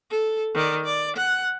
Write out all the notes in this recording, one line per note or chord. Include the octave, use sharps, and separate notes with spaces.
A4
D#3 D5
D5
F#5